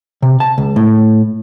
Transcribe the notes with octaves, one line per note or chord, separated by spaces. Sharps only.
C3
A5
C#2
A2